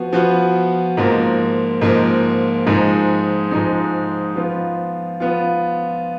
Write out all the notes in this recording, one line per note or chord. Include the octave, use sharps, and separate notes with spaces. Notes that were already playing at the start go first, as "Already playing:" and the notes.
Already playing: F3 B3 F#4
F3 B3 F#4
G#2 F3 A#3
G#2 F3 A#3
G#2 F3 G#3 D#4
G#2 F3 G#3 D#4
F3 B3 F4
F3 B3 F4